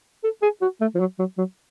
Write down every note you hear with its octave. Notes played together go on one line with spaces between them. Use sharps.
A4
G#4
F#4
A3
F3
F#3
F#3
F#3